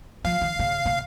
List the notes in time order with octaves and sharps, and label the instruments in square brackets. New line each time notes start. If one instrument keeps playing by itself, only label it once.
[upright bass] F3 [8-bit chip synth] F5
[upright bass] D#3
C#3
C#3